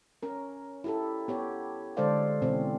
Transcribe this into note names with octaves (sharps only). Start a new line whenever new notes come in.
C#4 A#4
E4 G4 A4
B3 G4 C#5
D3 G#3 A4 C5 D5 F5
B2 E3 C4 C#4